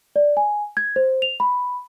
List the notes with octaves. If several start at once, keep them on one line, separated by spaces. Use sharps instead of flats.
D5
G#5
G#6
C5
F7
B5